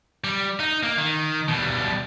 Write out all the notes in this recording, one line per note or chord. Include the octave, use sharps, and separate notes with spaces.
G3
D#4
A#3
D#3
B2 G3